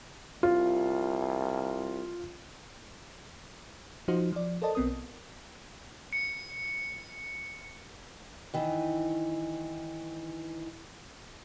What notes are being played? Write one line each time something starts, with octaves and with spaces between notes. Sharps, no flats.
C2 F4
F3 D#4 F4 F#4 C5
F3 D5
A4 A#4 C5 D5 D#5 A5
B1 B3 C4 A#4 D#6
C#7
D#3 E3